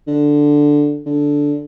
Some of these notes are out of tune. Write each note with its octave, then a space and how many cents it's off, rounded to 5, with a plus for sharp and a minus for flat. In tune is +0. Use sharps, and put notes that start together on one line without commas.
D3 +0
D3 -10